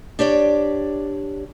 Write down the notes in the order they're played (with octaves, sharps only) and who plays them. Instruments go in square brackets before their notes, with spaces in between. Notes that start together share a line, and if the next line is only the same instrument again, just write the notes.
[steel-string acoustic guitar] D4 G4 C#5 D5